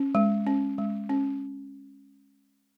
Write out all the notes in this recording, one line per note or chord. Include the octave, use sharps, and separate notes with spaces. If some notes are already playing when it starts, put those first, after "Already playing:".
Already playing: C#4
G#3
C#4
G#3
C#4